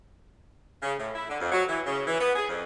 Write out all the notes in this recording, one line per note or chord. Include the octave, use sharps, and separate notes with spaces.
C#3
A2
E4
D3
F2
F#3
E3
C#3
E3
B3
G#4
F2